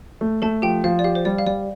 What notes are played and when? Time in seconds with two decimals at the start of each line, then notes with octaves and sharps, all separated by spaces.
0.21 A3
0.42 A3 A4 A5
0.62 F3 G4 G5
0.84 F3 F5
0.99 D5
1.04 G4 F5
1.15 C5
1.25 G3 D5
1.39 F5
1.46 G3 D5